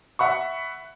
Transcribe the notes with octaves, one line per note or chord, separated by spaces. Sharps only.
E5 F#5 B5 C#6